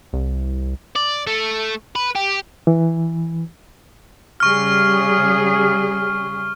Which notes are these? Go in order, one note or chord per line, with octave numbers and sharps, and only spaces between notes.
C2
D5
A3
B4
G4
E3
C#3 G3 G#4 C#6 F6